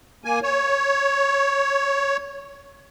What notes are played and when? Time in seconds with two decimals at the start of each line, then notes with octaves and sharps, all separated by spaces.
0.24 A#3 G#5
0.43 C#5